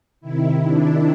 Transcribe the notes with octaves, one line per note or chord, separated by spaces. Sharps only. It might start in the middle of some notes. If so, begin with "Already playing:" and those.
C3 D#3 E4
D4